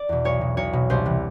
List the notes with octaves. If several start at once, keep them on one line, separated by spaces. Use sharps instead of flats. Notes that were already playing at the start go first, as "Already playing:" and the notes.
Already playing: D5
E2 B2
B1 C#5
B2
B1 C#5
B2
C2 C5
C3 E3